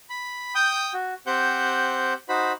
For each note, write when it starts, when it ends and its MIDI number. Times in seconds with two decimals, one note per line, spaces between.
0.10 0.54 83
0.55 0.93 79
0.55 0.93 87
0.55 0.93 91
0.93 1.14 66
1.27 2.13 60
1.27 2.13 67
1.27 2.13 72
1.27 2.13 78
1.27 2.13 91
2.29 2.53 63
2.29 2.53 66
2.29 2.53 72
2.29 2.53 83